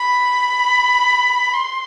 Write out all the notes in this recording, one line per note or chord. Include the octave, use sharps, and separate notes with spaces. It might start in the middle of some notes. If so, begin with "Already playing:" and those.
Already playing: B5
C6